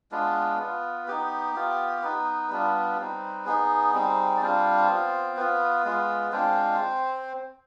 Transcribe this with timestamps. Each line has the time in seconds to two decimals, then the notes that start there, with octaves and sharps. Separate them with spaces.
0.11 G#3 B3 D4 F4 B4
0.59 B3 F4
1.08 B3 D#4 G4
1.55 B3 F4
2.02 B3 D#4 B4
2.50 G3 B3 D4 F4
2.99 G3 C4 D#4
3.46 B3 D#4 G#4
3.94 G3 C4 D#4
4.37 D5
4.42 G3 C4 D4 F4 C5
4.89 B3 F4
5.37 B3 F4 B4
5.85 G#3 B3 F4
6.32 G#3 C4 D4 F4 C5